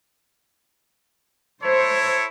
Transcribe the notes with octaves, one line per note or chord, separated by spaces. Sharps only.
E4 A4 C5 C#5